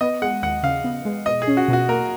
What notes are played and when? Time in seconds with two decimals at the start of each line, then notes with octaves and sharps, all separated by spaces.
0.01 B3 D#5
0.22 G#3 F#5
0.42 D#2 F#5
0.63 C#3 F5
0.84 B3
1.05 G#3
1.26 B2 D#5
1.42 G#4
1.48 C#4
1.57 F#4
1.68 B2 F#4
1.89 A#3 A#4